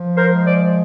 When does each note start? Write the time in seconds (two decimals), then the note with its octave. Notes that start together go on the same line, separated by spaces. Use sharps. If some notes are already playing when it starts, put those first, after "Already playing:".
Already playing: F3
0.17 A#4 C5
0.31 G#3
0.46 C5 D5